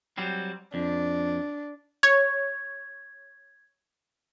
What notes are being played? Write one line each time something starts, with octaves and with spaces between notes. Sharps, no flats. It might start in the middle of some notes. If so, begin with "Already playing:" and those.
F#3 G3 C4
F2 D4
C#5 G#6